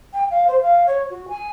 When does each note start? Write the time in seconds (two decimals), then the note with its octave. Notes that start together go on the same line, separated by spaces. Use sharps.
0.14 G5
0.31 F5
0.48 C5
0.62 F5
0.87 C#5
1.10 F#4
1.29 G#5